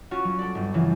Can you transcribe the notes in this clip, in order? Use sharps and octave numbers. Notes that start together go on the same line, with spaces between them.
C#4 F4 F#4
F#3
A4 D5
G1
C#3 E3 F3 C4 F4